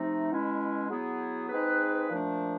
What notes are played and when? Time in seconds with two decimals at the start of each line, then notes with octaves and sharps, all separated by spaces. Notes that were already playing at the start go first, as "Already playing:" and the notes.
Already playing: C3 F3 A3 C4 D#4
0.30 B2 G#3 C#4 E4
0.89 F#3 B3 E4 G#4
1.50 G#3 C4 D#4 G#4 B4
2.09 A#2 F3 A3 D4